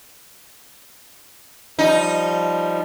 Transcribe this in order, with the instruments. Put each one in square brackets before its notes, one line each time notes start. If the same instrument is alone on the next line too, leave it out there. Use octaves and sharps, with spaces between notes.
[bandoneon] F3 G3 [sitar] D#4